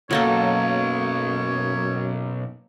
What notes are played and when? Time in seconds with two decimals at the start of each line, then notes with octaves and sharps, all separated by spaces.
0.11 B1 F#2 F#3 A#3 A4 C#5